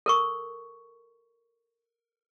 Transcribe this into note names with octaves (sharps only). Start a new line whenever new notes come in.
A4 A#4 C#6